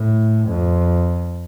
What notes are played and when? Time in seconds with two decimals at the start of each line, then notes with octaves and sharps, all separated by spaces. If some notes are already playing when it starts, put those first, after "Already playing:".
Already playing: A2
0.48 F2